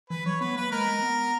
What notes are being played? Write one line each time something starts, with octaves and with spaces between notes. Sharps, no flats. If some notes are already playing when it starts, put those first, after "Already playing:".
E3 B4
F#3 C#5
B3 B4
A#3 B4
G#3 A#4
G#3
B3
B3